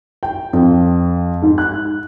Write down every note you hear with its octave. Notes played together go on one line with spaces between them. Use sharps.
G5
F2
G#2
F#6